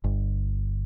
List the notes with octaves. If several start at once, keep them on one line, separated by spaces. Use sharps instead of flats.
G1